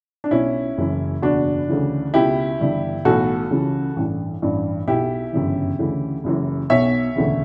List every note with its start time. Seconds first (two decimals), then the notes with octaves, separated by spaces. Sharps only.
0.24 D4
0.31 B1 B2 C#4 E4
0.77 F#1 F#2 E3
1.22 F#1 E2 B2 D4 F#4
1.68 D2 C#3 E3
2.14 C#2 B2 E4 G4
2.60 G1 G2 E3
3.05 B1 A2 E3 F#4 A4
3.51 C#2 C#3 E3
3.96 A1 G2 E3
4.42 A1 G2 E3
4.87 B1 B2 E4 G4
5.33 G1 F#2 C#3 E3
5.79 D2 C#3 E3
6.24 F#1 F#2 E3
6.70 B1 B2 C#5 E5
7.15 E1 D2 C#3 E3